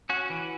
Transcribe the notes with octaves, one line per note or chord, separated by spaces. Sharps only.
C#4 F#4
E3